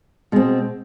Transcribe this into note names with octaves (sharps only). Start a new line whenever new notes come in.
B2 G#3 C4